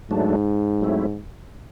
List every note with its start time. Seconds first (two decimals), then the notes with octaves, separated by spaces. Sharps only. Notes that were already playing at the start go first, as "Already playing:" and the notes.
0.11 G#2 F#3 A3 D4
0.81 F#3 A3 C4 E4